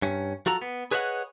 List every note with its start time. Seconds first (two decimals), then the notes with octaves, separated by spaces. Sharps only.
0.02 G2 C#4
0.46 F3 F#4 A4 A#5
0.62 B3
0.91 G#4 B4 C#5 D#5 E5 F#5